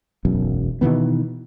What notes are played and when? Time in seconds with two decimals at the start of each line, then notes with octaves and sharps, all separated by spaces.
0.25 E1 B1 F#2
0.81 B2 D#3 E3 B3